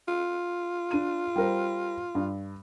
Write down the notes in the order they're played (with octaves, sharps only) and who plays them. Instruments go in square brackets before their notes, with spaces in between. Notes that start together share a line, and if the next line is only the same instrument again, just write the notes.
[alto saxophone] F4
[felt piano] D4 D#7
G3 A#4 C5
G2